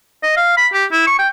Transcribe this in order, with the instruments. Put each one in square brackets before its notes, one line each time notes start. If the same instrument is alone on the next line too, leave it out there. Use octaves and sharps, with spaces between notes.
[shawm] D#5
F5
B5
G4
E4
C#6
G5